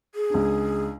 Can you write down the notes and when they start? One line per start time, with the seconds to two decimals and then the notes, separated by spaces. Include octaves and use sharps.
0.15 G#4
0.30 C#2 D4